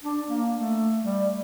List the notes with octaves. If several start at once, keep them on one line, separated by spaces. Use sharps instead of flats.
D4
A#3
A3
G3